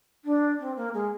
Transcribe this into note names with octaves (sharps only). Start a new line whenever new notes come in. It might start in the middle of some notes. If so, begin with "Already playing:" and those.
D4
C4
A#3
G#3